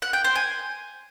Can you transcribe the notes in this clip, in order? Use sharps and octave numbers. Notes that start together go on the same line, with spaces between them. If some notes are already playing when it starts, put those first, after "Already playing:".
F#5
G5
C5
G#5